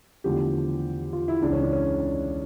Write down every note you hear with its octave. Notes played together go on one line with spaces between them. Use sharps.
E2 D3 F3 A3 G4
F4
E4
C#2 C#3 E3 D4
C#4
D4
C#4